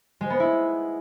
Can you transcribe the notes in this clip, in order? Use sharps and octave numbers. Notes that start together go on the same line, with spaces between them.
G#3
B3
E4